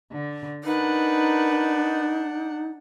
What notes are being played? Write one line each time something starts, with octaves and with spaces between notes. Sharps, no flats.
D3
D4 D#4 A#4 B4 F#5